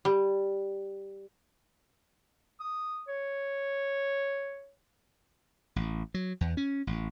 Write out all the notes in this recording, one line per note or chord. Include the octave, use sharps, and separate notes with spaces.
G3
D#6
C#5
A1
F#3
E2
C#4
A1